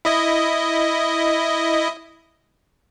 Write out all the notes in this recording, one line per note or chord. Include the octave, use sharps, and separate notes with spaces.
E4 D#5